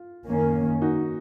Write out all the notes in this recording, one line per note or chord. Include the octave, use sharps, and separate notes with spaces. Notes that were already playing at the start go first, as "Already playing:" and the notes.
Already playing: F4
F#2 D#3 A#3 C#4
D#4 F#4